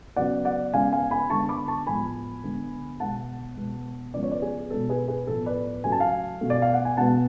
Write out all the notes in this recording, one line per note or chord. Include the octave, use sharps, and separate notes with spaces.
C#3 F#3 B3 D5 F#5
D5 F#5
C#3 G#3 B3 F5 G#5
F5 G#5
G#5 B5
D3 G#3 B3 A5 C#6
B5 D6
A5 C#6
A2 F3 G#3 B3 G#5 B5
D3 G#3 B3
B2 G#3 B3 F#5 A5
B2 G#3 B3
C#3 F3 G#3 B3 D5
C#5
B4 D5
G#4
B2 G#3 B3 A4
G#4 B4
G#4 B4
A2 F3 B3 A4
B4 D5
C#3 F#3 A3 G#5
A5
F5 G#5
B2 A3
D5
F5
F#5
G#5
B2 G#3 B3 F#5 A5